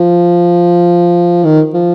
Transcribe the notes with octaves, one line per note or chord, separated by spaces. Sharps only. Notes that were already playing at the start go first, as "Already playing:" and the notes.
Already playing: F3
D#3
F3